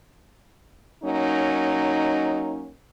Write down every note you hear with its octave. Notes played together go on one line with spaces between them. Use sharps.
F#3 A#3 C#4 D#4